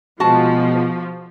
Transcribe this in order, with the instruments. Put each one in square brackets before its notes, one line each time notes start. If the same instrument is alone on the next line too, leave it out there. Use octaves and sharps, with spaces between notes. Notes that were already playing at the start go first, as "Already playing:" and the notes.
[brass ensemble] B2 G#3 [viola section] F3 [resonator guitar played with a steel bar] F#4 A5